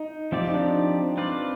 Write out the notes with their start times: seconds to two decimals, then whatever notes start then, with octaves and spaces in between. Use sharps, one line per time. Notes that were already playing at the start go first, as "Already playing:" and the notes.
Already playing: D#4
0.32 F3 C4 F4 G4 D5
0.48 D#4
0.54 D4
1.17 C4 F4 B4 D5